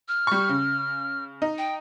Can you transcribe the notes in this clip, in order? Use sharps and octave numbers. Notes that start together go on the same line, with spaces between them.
F6
G3 C#6
C#3
D#4
G5